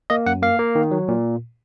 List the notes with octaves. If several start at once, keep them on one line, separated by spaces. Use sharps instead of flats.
A#3 D#5
F#2 F#5
A#3 F5
A#3
D#3
F#3
A#2